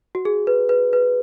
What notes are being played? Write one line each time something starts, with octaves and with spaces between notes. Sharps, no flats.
F#4
G#4
B4
B4
B4